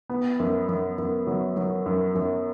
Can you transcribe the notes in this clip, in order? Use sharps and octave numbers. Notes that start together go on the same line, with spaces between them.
B3
F#2
F#2
F#2
F#3
F#3
F#2
F#2